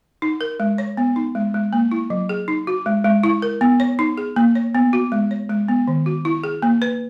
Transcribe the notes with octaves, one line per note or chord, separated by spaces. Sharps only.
D#4
A#4
G#3
C#5
B3
D#4
G#3
G#3
A#3
E4
F#3
G#4
D#4
F#4
G#3
G#3
E4
A#4
B3
C#5
D#4
G#4
A#3
C#5
B3
F#4
G#3
C#5
G#3
B3
D#3
F#4
E4
G#4
A#3
B4